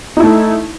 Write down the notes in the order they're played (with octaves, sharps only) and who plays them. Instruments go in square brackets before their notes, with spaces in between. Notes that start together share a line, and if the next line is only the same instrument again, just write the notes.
[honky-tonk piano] D#4
E4
A3